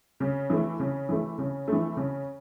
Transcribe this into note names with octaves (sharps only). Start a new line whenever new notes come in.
C#3
E3 A3
C#3
E3 A3
C#3
E3 A3
C#3